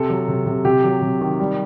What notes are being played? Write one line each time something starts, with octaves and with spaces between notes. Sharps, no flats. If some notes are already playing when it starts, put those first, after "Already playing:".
Already playing: C3 A4
F#3
C3
C3
C3 G4
F#3
C3
D#3
G3